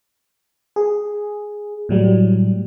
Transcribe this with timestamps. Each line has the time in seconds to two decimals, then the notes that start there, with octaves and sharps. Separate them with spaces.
0.76 G#4
1.89 A2 F#3 G3